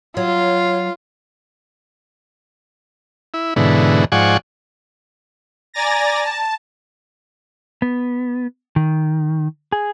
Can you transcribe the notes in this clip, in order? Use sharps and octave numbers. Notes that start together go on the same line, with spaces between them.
F#3 F4
E4
G#2 B2 D3 E3
G#2 F3 D5 F#5 G#5 C#6
D5 G#5 A#5 A6 A#6
A5
B3
D#3
G#4